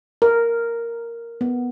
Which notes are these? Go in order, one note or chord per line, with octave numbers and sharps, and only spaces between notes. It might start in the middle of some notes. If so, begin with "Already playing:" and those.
A#4
B3